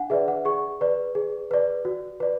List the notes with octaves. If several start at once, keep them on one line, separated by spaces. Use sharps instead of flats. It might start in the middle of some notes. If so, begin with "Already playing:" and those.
Already playing: D4 F#5 G#5
G#4 B4 D5 E5
F#5
G#4 C#6
B4 D5
G#4
B4 D5
F#4
B4 D5